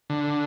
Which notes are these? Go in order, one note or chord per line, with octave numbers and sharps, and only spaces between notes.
D3